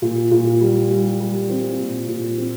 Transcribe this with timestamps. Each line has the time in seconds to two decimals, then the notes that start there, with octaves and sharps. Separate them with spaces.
0.02 A#2
0.31 A#2
0.61 G3
0.91 G3
1.20 G3
1.50 C4
1.79 A#2
2.08 A#2
2.38 C4